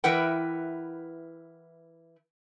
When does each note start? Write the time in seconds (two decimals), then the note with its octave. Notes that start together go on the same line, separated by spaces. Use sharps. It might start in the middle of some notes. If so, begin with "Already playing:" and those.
0.04 E3 E4 A#4 B4 F#5 G5